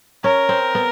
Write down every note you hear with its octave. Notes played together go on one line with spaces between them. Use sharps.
C#4 A#4
C4
B3